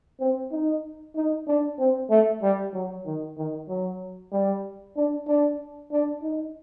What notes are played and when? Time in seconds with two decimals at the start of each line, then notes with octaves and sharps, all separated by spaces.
0.20 C4
0.51 D#4
1.16 D#4
1.47 D4
1.79 C4
2.10 A3
2.42 G3
2.73 F#3
3.06 D#3
3.37 D#3
3.69 F#3
4.32 G3
4.96 D4
5.27 D4
5.91 D4
6.23 D#4